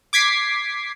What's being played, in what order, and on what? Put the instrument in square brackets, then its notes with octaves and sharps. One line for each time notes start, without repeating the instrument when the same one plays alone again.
[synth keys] D6 G#6 B6 C7